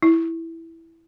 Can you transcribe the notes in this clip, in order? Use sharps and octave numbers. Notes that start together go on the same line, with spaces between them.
E4